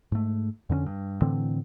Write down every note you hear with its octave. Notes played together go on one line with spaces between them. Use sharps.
G#2 A3
F2 D3 B3 C#4
G2
A2 D3 E3 C4